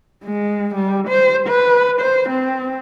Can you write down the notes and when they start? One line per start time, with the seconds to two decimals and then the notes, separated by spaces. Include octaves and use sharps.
0.24 G#3
0.75 G3
1.08 C5
1.47 B4
2.01 C5
2.30 C4